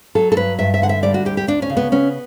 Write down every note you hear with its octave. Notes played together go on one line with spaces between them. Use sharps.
F#3 A4
A4
G2 B4
G2 E5
E5
D3 F#5
E5
G3 D5
F#4
D2 G4
G4
D2 D4
C#4
C#3
B3
B3 C#4